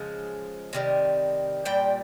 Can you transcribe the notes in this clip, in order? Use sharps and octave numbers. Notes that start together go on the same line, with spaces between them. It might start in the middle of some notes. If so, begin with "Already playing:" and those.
Already playing: C#3 F3 G#3
C3 D#3 G3
A#2 G3 G5